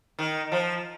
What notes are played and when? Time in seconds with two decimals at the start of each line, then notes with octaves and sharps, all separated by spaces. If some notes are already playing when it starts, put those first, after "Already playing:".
0.19 D#3
0.52 F3